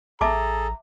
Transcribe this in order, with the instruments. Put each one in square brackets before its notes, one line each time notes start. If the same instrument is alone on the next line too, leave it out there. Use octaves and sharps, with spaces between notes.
[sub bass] A1 [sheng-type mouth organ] G#4 A4 [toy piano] E5 A5 D6 [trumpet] A#5